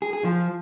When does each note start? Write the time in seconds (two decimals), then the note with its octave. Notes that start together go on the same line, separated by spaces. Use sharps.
0.02 G#4
0.13 G#4
0.24 F3